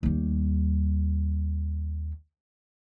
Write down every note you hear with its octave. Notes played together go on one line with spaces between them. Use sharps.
D#2 G3